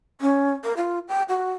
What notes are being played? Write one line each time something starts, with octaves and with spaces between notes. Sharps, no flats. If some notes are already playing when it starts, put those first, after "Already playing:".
C#4
A#4
F4
G5
F#4